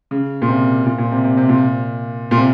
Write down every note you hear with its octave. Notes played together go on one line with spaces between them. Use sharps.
C#3
A#2
C3
A#2
A#2
C3
C3
C3
A#2
A#2
C3